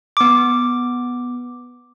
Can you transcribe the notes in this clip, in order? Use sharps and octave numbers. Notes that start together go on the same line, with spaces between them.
B3 D6